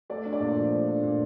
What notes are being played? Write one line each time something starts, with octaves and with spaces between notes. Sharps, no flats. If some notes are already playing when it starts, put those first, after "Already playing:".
A3 D5
D4
D5
A#2
F3
A3
D4
A#2